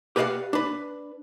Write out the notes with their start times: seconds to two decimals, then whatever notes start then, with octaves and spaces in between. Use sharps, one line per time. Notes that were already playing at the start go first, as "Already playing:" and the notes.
0.16 G4 B4 D5 D#5 F5 F#5
0.53 D4 B4